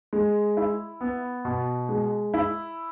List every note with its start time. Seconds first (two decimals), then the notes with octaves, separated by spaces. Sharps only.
0.13 G#3
0.57 E4
1.01 B3
1.45 B2
1.89 G#3
2.34 E4